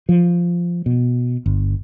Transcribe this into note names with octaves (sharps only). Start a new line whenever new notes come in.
F3
B2
G1